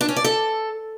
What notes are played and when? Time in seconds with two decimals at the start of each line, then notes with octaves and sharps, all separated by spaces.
0.01 D4
0.09 C#4
0.16 D5
0.24 A4